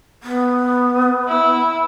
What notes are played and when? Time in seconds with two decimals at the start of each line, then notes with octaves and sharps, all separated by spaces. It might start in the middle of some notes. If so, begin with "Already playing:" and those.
0.23 B3
1.28 E4